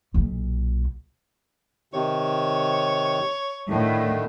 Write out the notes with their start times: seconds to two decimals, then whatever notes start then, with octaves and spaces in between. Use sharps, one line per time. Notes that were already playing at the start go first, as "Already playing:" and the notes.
0.14 B1 A#2
1.94 C3 D#3 C#5
3.70 A2 D3 D#3 A3